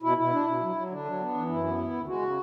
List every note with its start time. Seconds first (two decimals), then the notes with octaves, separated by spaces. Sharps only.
0.02 B2 E4
0.17 B2 E4
0.32 D4
0.46 B2
0.61 F#3
0.76 F#3
0.90 D3 D4
1.05 F#3
1.20 B3
1.34 E3
1.49 F#2 E4
1.64 B3
1.78 D2
1.93 D2
2.07 G#3 F#4
2.22 C#3